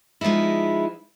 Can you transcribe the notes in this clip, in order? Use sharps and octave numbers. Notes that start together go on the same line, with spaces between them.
F3 G#3 B3 D#4 E4